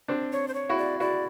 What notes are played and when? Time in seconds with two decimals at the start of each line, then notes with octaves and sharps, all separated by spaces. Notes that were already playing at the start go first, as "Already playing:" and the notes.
0.08 C4 D4
0.32 C#5
0.48 C5
0.54 C#5
0.69 E4 F#4
0.78 D5
1.00 E4 F#4 D5